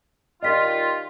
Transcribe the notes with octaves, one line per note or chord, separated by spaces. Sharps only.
D#3 G3 F4 D#5 B6